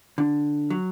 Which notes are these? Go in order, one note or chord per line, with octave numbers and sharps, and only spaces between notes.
D3
F#3